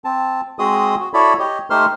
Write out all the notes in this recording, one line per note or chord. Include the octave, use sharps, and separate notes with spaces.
C4 A5
G#3 C4 F#4 G#4 D#5 D#6
F#4
E4 F#4 A4 C#5 D5 B5
G4 C#5 D#5
A3 D#4 G4 C5 C6 F6